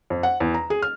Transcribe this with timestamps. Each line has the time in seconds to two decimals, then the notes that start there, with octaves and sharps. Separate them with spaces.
0.10 F2
0.23 F#5
0.40 E2
0.54 A#5
0.70 G#4
0.82 F6